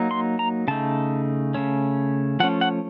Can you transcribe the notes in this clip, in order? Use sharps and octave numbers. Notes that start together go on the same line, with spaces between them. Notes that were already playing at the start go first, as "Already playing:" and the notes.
Already playing: F#3 A#3 D#4
C6
A#5
C#3 A3 D#4 A5
C#3 A3 C#4
F3 A3 C#4 F#5
F#5